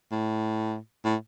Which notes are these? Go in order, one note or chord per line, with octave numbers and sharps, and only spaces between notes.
A2
A2